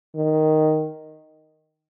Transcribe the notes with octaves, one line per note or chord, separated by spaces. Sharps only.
D#3